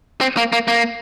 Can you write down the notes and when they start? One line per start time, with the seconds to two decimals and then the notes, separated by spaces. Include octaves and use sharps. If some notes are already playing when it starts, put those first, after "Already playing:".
0.21 C4
0.37 A#3
0.53 A#3
0.68 A#3